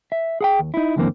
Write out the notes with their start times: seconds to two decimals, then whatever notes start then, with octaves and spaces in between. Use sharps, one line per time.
0.12 E5
0.41 G#4 F#5 G5
0.59 D#2
0.74 D#4 E4
0.96 C#2 F#2 D3 E3 A#3 C4